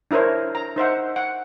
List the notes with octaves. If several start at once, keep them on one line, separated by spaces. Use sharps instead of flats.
D4 E4 A#4 C5 C#5
A#5
D#4 C5 E5 F#5
F#5